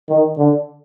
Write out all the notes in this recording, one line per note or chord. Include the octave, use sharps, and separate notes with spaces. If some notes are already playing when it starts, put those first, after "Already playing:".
D#3
D3